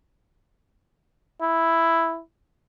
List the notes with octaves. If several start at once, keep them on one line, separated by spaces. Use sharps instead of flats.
E4